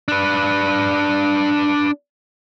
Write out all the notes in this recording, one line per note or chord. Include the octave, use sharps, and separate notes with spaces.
D4 B4